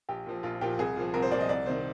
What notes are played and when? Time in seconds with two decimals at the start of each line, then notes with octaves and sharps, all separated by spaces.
0.09 A#1 G4
0.26 A#2 F3
0.43 A#1 F4
0.61 A#2 F3 G4
0.79 C2 G#4
0.96 A#2 F3
1.14 C2 A#4
1.22 C5
1.31 A#2 F3 D5
1.40 D#5
1.49 C2 D5
1.66 C3 D#3 C5